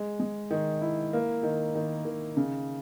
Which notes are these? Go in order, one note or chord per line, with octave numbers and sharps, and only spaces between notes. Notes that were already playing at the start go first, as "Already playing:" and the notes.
Already playing: G#3
G#3
D#3
E4
A#3
D#3
D#3
D#3
C#3